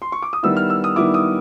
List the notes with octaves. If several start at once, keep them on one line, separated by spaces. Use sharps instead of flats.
C6
C#6
D6
D#6
D#3 G3 B3 E4 E6
F6
E6
D#6
D#3 G3 B3 E4 D6
D#6